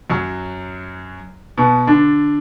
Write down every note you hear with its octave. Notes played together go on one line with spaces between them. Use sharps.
F#2 F#3
B2 B3
D3 D4